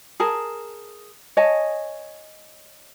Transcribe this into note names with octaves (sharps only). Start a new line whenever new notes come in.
G#4 A#4 A5
C#5 D#5 G#5 A5